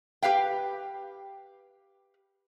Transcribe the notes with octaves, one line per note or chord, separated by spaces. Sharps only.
G4 B4 F5 G5